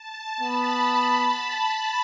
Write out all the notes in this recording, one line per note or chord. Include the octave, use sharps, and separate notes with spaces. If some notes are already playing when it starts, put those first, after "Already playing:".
Already playing: A5
B3 B5